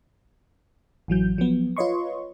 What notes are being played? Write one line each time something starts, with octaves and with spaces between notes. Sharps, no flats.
A1 E3 F#3 G6
F3 F#3 B3
F4 B4 C#5 D#5 C6 C#6